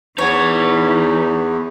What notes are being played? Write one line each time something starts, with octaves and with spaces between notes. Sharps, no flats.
E2 E3 D#4 C#5 F#5